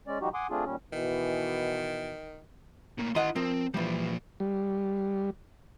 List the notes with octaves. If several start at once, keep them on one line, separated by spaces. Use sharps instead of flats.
G#3 C#4 D5
F3 G3 D#4 F#4 G4
F#5 G#5 C6 D6 D#6
A3 C4 D4 F4 G#4
D#2 A#2 G3 C#4
B2 D#3 E3
A2 A#3
D#3 E4 D#5 F#5 C6
F3 C4 A#4
A#2 E3 F3 G3
G3